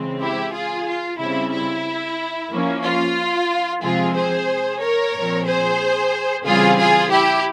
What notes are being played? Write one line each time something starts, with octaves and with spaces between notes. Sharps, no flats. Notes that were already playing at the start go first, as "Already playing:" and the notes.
Already playing: C#3 E3 G#3 C4
E4 G4
F4 G#4
F4
C#3 G3 C4 E4
E4
F3 A#3 C#4
F4
C3 F3 G#3 C4 F4 G#4
G#4 C5
A#4 C#5
A#2 F3 C4
G#4 C5
C#3 E3 G3 C4 F4 G#4
F4 G#4
E4 G4